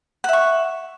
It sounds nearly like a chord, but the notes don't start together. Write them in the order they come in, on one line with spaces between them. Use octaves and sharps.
F#5 E5 C#6